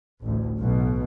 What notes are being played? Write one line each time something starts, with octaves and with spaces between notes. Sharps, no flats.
A1 D2
B1 B2